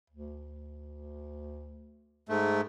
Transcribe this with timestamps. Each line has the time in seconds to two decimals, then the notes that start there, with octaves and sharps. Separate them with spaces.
0.10 D2
2.29 G#2 A3